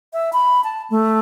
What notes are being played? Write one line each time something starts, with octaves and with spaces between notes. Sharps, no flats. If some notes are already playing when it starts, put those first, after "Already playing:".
E5
B5
A5
A3